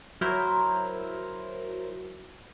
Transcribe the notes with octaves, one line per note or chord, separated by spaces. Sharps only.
F#3 E4 A#4 C5